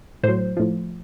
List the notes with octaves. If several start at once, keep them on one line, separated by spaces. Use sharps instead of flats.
A2 F#3 C5
A2 F3